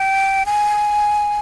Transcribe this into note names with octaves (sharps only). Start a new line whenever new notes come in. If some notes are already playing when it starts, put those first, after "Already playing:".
Already playing: G5
G#5